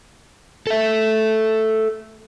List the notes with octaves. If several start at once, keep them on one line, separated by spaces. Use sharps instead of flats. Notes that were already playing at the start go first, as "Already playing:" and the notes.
A4 E5